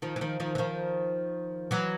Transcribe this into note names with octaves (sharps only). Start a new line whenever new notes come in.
D#3 F3
E3
D#3 F3
D#3 F3
E3
D#3 F3
E3 F#3